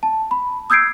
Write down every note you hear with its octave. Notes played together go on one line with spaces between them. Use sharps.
A5
B5
D#6 E6 G6 G#6 C7 D7